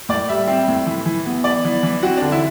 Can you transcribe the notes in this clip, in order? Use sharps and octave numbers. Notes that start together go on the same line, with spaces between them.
A2 D5
G3 E5
C4
A2
E3
E3
B3
B3 D5
E3
E3
C4 F#4
D3 D4
E4